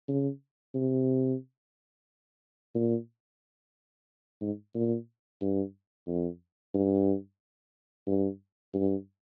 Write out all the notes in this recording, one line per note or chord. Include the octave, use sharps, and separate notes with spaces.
C#3
C3
A#2
G#2
A#2
G2
F2
G2
G2
G2